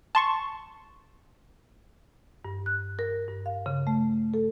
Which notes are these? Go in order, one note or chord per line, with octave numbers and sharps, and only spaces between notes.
A5 C6 C#6
G2
F#6
A#4
G2
F5
C#3
A3
A4